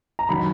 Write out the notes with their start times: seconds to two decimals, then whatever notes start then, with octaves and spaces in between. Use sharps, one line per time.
0.19 A#5
0.29 D#3 F#3 B5